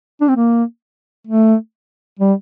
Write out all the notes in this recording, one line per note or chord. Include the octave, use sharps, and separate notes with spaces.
D4
C4
A#3
A3
G3